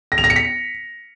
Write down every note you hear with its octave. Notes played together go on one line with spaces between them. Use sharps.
A#6
F7
A#6
C#7
B6